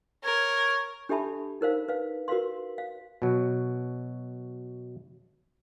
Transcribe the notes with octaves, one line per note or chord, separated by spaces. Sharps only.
A#4 C#5 G#6
D4 G4 A4 E5 A5 B5
D#4 A#4 C5 F5
B4 F5
F#4 A#4 B4 F5 C6
F5
B2 F#3